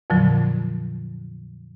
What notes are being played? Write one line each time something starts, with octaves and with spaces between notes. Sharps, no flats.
F2 A#2 D3 F3 F#3